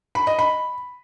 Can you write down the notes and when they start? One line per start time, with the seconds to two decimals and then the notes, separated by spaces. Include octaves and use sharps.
0.15 B5
0.27 D#5
0.39 B5